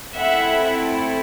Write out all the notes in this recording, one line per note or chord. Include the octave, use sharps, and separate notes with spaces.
A3 C4 E4 A4 E5 F#5